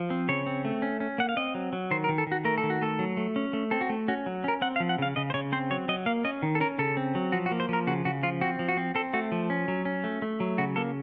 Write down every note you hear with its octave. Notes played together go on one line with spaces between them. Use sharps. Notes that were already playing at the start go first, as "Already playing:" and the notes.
Already playing: F3
C4
C#3 C#5
C4
A3
C#4
C#4
A#3 F#5
F5
C4 D#5
F#3
F#3
D#3 C5
A#4
D#3
A4
D#3 F#4
A3 A#4
A4
D#3
F#4
A3 A4
F#3
A3
C#4
A3
C4 A4
F#4
A3
C#4 F#4
F#3
C#4 A#4
C4 F#5
F5
F3
F#5
C#3 F5
C#3 D#5
C5
C#3 C#5
C4 C5
F#3 C#5
F#3 D#5
A#3 F5
C#4 D#5
D#3
A4
C#4 A#4
C#3 A4
C4
F#3
F3 F#4
F#4
A#3
C5
F3 A#4
C#3 F#4
C#3 F#4
F3 F4
C4 F#4
F3
F#4
C4
C4 A4
A3 F#4
F3
C#4
F#3
C#4
A3
A3
F#3
C#3 F#4
A#3 A4